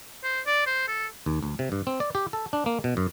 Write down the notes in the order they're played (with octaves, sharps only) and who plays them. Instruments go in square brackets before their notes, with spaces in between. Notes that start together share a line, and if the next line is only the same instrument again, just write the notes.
[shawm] C5
D5
C5
A4
[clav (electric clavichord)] D#2
D2
C3
G2
C4
D5
G4
A4
D4
A#3
B2
F#2